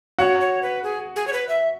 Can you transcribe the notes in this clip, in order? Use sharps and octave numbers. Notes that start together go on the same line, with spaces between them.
F#4 C#5 F#5
C#5
B4
G#4
G#4
C#5
B4
E5